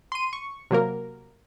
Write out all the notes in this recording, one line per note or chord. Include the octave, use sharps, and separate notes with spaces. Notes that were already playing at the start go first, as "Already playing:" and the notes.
C6 D#7
C#6
C3 F#3 A#3 A#4